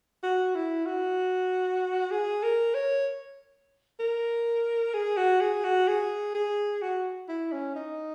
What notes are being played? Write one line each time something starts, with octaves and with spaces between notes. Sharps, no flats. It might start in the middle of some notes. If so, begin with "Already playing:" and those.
F#4
E4
F#4
G#4
A#4
C#5
A#4
G#4
F#4
G#4
F#4
G#4
G#4
F#4
E4
C#4
D#4